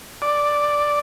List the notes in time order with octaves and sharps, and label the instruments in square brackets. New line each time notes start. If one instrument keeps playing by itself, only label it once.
[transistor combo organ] D5